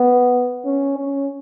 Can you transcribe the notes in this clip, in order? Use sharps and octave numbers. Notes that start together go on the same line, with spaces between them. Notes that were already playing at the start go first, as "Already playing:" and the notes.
Already playing: B3
C#4
C#4